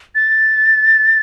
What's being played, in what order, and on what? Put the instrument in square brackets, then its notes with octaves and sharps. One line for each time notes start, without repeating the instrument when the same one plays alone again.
[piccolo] A6